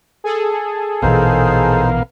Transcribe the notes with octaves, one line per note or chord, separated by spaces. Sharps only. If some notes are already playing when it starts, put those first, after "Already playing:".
G#4 A4
A#1 B2 E3 B3 D#4 A#4 C5 F5